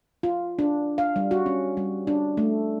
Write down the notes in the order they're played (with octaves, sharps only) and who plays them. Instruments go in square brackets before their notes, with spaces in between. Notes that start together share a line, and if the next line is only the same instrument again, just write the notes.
[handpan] F4
D4
F5
G3
F#4
C#4
G3
D4
A3